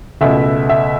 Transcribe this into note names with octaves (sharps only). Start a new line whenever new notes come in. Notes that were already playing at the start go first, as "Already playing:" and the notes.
C#2 B2 A3 E5
E5